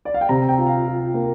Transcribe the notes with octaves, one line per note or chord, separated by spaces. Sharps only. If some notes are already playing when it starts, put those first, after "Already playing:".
D5
F5
G5
C3 A#5
G5
F4
F5
F4
A#3